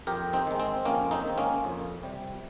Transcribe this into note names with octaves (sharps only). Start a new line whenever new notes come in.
F2 G4 A#4
C4 D#4
D#3 G#3
C4
F2 A#3 C#4
C4 D#4
D#3 G#3
A#3 C#4
F2
C3 G3